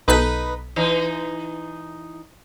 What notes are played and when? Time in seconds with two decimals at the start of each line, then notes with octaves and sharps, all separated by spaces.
0.08 B1 D#4 A4 B4 B6
0.76 E3 D#4